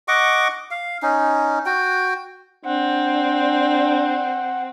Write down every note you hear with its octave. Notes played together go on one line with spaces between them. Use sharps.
D#5 F#5 C#6 D6
F5
C#4 D#4
F#4 G5
C4 D4 F#5